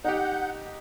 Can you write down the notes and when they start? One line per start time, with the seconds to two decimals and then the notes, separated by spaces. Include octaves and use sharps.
0.04 D#4 G4 F#5 G6